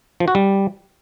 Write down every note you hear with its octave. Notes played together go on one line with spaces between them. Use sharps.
F3
F#4
G3